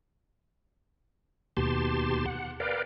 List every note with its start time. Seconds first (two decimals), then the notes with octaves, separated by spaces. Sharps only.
1.57 D#2 B2 G4 A5 C6
2.26 F#5
2.60 A#4 B4 D5 F5 G5